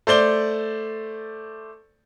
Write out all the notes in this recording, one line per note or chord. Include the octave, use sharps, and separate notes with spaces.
A3 C5 D5 G7